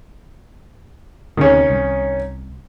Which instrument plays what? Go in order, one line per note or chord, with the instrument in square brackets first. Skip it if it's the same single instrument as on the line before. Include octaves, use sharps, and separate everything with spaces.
[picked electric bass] D2 C3 [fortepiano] D#3 C#4
[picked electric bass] C2